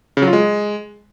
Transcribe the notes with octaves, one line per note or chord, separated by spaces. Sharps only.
C#3
F#3
F4
G#3